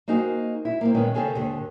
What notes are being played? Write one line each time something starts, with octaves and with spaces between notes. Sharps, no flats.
A#3 C4 D#4 F#4 G#4
E4
A#3 C4
A#2 D#3 G#3 B3 C#4 D#4
C#3 C4 G#4 A4 B4 C#5
D#2 G#2 D3